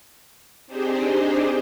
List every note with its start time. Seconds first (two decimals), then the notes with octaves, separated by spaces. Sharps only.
0.67 C4 D4 D#4 G4 G#4 C5